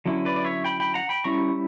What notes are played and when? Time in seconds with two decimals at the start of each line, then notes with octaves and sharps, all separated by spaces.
0.06 D3 F#3 C#4 E4
0.25 B4 D5
0.36 D5
0.45 C#5 E5
0.65 G5 B5
0.80 G5 B5
0.94 F#5 A#5
1.09 G5 B5
1.24 G3 C#4 E4 A#5 C#6